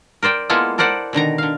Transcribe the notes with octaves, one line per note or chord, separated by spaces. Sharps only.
A#4 C5 D5 G5
G#3 A#3 B3 E4 F4 A4
A4 A#4 C5 D5 F#5
B2 D3 D#3 A#5
D3 F5